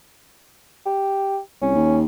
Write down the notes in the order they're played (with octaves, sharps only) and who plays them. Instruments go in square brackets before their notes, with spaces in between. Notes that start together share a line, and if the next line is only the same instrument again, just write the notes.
[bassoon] G4
[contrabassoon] C2 [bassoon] C#4
[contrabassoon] D#2